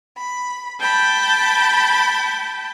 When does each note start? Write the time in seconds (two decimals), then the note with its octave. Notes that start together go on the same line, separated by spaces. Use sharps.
0.18 B5
0.80 G5 A5 B5